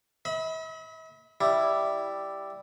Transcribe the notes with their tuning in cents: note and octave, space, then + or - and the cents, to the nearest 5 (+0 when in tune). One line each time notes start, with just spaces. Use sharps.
E5 -45 B5 +0
G3 +0 E4 +0